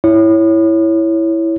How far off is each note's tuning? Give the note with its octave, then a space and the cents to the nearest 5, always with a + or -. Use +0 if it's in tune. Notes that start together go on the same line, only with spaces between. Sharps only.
E4 +0 C#5 +0